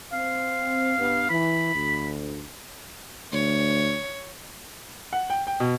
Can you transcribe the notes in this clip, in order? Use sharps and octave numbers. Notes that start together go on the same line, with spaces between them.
C4 F5
G2 B3
E3 B5
D2
D2 C#5
F#5
G5
G5
B2